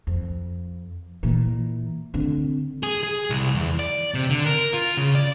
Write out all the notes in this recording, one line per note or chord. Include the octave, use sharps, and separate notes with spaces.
F2
A#2 E3
D3 C4
G#4
G#4
C2
E2
D5
C3
D3
A#4
F4
C#3
D5